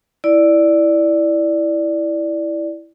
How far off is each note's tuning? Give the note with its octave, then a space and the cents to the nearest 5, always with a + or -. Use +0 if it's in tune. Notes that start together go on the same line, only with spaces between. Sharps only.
E4 +0 D5 +0